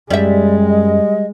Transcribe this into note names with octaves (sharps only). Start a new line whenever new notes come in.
F#2 G3 G#3 D5 E5
D#5